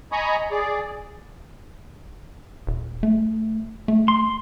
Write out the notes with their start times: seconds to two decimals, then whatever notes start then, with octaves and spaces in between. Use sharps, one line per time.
0.12 D#5 G#5 A#5 B5 C#6 D#6
0.51 G#4 D5
2.67 D#1
3.03 A3
3.88 A3
4.08 C6